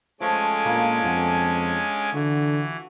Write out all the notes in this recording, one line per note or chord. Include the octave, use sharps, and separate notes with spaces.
F3 G#3 A3 C#4 D6
A#2 A#3 D4
F2 F#5 A5
D3 E3 F#4